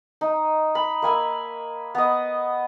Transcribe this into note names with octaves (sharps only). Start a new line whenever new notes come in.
D#4
B5
A#3 G#5 B5 E6
B3 D#5